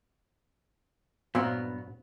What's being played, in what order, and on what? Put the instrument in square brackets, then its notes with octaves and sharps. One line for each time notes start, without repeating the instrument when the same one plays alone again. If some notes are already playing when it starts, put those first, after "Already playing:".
[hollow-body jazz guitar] G2 F#3 B3 [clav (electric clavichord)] A#2 C4 E4